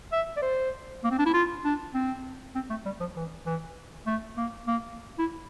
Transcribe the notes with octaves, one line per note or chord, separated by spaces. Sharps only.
E5
D5
C5
A#3
C4
D4
E4
F4
D4
C4
C4
A3
G3
F3
E3
E3
A3
A#3
A#3
E4